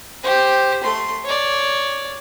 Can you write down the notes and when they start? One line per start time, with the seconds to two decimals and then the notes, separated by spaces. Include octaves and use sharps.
0.23 G4 C5
0.83 A3 C6
1.24 C#5 D5